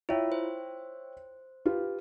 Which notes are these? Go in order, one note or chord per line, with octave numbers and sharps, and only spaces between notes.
E4 F4 C#5 E5 G5
C5
F4 G4 B4